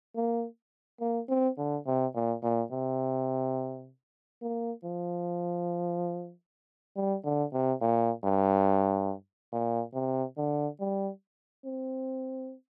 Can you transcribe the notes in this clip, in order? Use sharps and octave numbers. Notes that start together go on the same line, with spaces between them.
A#3
A#3
C4
D3
C3
A#2
A#2
C3
A#3
F3
G3
D3
C3
A#2
G2
A#2
C3
D3
G3
C4